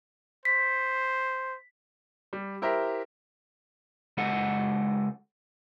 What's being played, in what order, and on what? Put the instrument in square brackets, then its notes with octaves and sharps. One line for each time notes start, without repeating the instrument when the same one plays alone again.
[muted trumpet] C5 [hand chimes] B6
[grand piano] G3
E4 G4 A#4 C5 E5
[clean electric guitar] C#2 G#3 F#4 A4 D#5 F#5